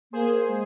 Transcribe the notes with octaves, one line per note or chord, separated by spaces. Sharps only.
A#3 G#4 C5
G#3